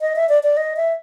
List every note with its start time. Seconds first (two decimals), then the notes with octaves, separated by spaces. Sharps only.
0.01 D#5
0.16 E5
0.29 D5
0.43 D5
0.57 D#5
0.76 E5